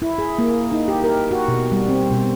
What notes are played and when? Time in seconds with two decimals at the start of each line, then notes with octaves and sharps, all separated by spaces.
0.02 E4
0.18 G#4
0.39 A#3
0.72 D#4
0.88 G4
1.04 A#4
1.31 F#4
1.48 B2
1.72 G3
1.88 C4
2.12 B2